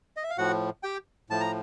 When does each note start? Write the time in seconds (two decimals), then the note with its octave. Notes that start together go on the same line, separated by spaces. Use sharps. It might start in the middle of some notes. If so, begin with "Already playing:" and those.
0.16 D#5
0.24 E5
0.30 F5
0.38 A2 F3 F#4 F#5
0.83 G4 G5
1.30 A2 F3 A5
1.40 A#5